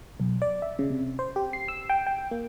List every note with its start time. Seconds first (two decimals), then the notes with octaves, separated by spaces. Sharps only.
0.20 B1
0.42 D5
0.62 E5
0.79 C#3
0.90 C3
1.19 C5
1.36 G4
1.53 C7
1.68 E6
1.90 G5
2.07 G5
2.31 A#3